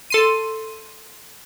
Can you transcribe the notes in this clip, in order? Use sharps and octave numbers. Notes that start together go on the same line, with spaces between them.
A4 C6 D#7